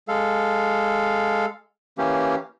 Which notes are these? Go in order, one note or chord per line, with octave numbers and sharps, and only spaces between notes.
G#3 A4 F5
E3 A#3 C#4 G4